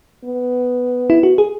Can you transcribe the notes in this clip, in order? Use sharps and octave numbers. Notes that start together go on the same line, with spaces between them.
B3
E4
F#4
G#4